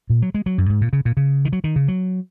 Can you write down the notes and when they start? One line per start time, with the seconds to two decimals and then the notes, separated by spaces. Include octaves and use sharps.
0.10 A#2
0.22 F#3
0.34 G#3
0.46 F#3
0.58 F#2
0.70 G#2
0.81 A#2
0.93 C#3
1.05 A#2
1.17 C#3
1.45 D#3
1.53 F#3
1.64 D#3
1.76 C#3
1.88 F#3